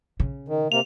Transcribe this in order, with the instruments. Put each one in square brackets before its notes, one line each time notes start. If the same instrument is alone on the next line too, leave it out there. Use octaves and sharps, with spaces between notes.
[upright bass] C#3
[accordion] D#3
[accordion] C3 A#3 [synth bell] F7